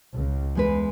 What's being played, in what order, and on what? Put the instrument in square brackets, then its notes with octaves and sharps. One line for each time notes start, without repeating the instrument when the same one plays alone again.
[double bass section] C#2
[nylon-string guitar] E2 G#3 B4